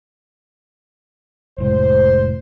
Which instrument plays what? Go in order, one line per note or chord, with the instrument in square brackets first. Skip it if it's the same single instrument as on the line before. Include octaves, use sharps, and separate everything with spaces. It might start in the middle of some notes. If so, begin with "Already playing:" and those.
[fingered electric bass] F1 A2 G#3 [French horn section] C5